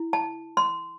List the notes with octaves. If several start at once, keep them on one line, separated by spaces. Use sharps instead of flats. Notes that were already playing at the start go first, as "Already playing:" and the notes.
Already playing: E4
A5
C6